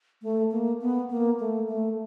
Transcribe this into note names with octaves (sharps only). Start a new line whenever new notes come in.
A3
A#3
B3
A#3
A3
A3